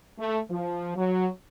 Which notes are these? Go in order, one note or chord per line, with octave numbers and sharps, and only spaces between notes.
A3
F3
F#3